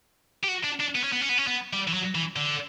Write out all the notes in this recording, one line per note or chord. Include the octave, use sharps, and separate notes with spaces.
G4
F#4
D4
D4
B3
C#4
B3
C#4
B3
C#4
B3
G3
E3
F#3
E3
D3